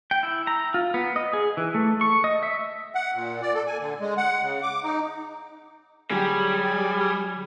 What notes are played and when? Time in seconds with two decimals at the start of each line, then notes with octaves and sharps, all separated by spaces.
0.11 G5
0.23 E4
0.47 A#5
0.74 F4
0.94 B3
1.16 D#5
1.33 G#4
1.57 E3
1.74 A3
2.01 C#6
2.24 D#5
2.43 E5
2.95 F#5
3.14 A#2
3.42 D5
3.54 A4
3.67 G#5
3.80 D3
4.00 G#3
4.17 F#5
4.42 C#3
4.62 D6
4.84 D#4
6.11 D3 F#3 G3 G4 G#4 G#5